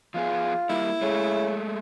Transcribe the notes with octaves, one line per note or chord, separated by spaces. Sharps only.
F3 B3 F4 G#4
G3 A#3 E4
C#3 G#3 A3